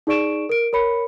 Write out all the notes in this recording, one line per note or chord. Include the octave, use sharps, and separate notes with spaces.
D#4 G#4 D5 C#6 D7 E7
A#4 D7
A#4 C#5 B5 C#7